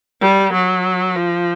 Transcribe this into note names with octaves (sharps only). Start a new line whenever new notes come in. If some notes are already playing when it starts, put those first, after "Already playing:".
G3
F#3
F3